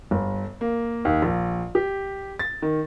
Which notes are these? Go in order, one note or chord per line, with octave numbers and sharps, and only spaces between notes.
G1
A#3
D#2
A#1
G4
A6
D#3